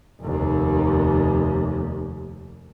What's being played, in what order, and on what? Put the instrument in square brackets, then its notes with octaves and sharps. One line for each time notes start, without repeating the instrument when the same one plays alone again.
[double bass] F1 D#2